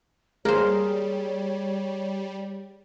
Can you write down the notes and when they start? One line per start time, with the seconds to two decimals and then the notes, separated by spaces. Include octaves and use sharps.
0.45 G3 A#3 G#4 C5 C#5